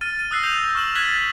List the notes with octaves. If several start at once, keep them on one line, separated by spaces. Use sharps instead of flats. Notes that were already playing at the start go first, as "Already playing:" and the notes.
F6 A6 D#7
D#7
D#6 E6 F#6 A#6 C7
G6 F7 G7
C#6 F6 E7 F#7
F#6 G#6 A6 B6 F#7 G7